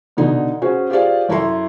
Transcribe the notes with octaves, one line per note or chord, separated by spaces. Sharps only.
B2 D3 D#4
C#4 F#4 G#4 C5
F4 G4 G#4 C5 D5 F5
F#2 E4 A4 A#5 C6